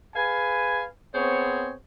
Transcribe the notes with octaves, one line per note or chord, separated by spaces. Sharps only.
G#4 B4 F5 G#5
B3 C4 G#4 C5 C#5